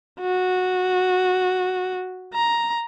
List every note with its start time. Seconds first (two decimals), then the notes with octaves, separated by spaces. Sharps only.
0.21 F#4
2.34 A#5